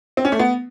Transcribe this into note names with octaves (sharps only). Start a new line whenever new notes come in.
C4
C#4
A3
B3